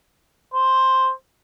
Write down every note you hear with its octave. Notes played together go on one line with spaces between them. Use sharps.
C5